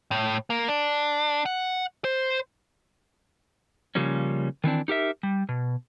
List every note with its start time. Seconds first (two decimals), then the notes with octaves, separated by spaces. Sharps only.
0.11 A2
0.50 A#3
0.68 D4
1.46 F#5
2.04 C5
3.95 C#3 F3 G3 A#3 C#4
4.64 D#3 E3 C4 D4
4.88 D#4 G4 A#4 E5
5.23 G3
5.49 B2